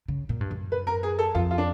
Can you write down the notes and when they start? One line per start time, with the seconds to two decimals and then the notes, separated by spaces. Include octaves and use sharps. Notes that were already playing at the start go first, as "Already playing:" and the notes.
0.08 C#3
0.29 A#2
0.41 G2
0.51 F#2
0.72 B4
0.87 A#4
1.03 G#4
1.19 A4
1.35 F2 F4
1.51 F4
1.58 D4